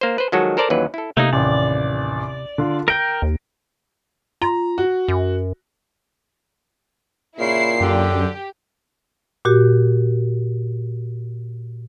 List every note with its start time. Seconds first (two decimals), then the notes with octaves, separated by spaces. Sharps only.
0.01 A#3 C5
0.18 B4 C5
0.32 D#3 F3 F#3 G#3 F#4 A4
0.57 A4 A#4 C5 D5 A5 A#5
0.70 D#2 E3 F#3 C#4 B4
0.94 E4 A4
1.17 C3 A3 A#3 D#4
1.33 A1 D#2 D5
2.58 D3 F4
2.88 A#4 G5 A#6 D7
3.22 D#2
4.42 F4 A#5
4.78 F#4
5.08 F#2
7.39 A#2 C#3 E4 C7
7.81 F#2 D3 G4
9.45 A#2 F#4 G4